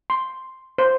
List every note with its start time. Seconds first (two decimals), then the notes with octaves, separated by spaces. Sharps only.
0.10 C6
0.78 C5